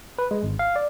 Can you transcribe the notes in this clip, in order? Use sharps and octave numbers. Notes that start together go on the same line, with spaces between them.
B4
G#3
G#1
F5
D5